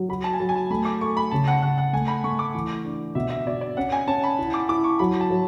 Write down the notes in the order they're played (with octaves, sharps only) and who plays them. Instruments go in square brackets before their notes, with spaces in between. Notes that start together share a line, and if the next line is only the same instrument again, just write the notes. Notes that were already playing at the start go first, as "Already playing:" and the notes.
Already playing: [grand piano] F#3
[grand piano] F#4 [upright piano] B5
[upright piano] A5
G#5
[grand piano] F#3 [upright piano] A5
[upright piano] G#5
A5
[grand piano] A3 [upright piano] B5
[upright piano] D6
[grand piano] A4 [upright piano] C#6
[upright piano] B5
[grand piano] C#3 [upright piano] A5
[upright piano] F#5
[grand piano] C#3 [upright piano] F#5
[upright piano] F#5
[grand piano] A3 [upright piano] G#5
[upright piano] B5
[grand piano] A3 [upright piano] C#6
[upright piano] D6
[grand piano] E3
D4
[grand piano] B2 [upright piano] E5
[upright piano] E5
[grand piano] B2 [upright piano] D5
[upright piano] D5
[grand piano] C#4 [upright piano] F#5
[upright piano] G#5
[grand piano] C#4 [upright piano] A5
[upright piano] B5
[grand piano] E4
[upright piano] D6
[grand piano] E4 [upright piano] D6
[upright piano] C#6
[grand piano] F#3 [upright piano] B5
[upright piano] A5
[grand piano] F#3